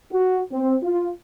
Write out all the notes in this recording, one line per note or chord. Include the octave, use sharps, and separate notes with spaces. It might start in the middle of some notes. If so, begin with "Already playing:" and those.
F#4
C4
F4